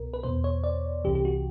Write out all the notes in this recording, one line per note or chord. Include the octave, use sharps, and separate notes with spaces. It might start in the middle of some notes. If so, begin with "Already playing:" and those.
Already playing: C2 B2 A#4
B4
E2 B2 C5
C#5
D5
C2 C3 E3 G4
G4
F#4